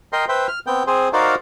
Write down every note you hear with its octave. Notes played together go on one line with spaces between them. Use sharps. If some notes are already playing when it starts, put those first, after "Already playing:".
A#4 D#5 G5 C6
B4 C5 E5 G5
F6
B3 C4 G5
C4 G#4 C5
D#4 F#4 A#4 C5 D5 F5